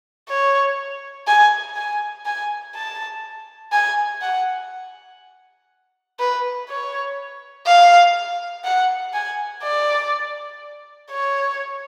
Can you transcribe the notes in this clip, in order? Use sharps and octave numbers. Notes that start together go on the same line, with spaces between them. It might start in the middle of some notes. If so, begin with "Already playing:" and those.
C#5
G#5
G#5
G#5
A5
G#5
F#5
B4
C#5
F5
F#5
G#5
D5
C#5